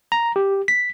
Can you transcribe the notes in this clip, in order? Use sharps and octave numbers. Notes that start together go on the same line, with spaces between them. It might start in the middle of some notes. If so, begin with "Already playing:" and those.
A#5
G4
B6